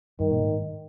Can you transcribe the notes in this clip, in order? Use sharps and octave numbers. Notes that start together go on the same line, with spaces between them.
G2 D#3
A#2
G#2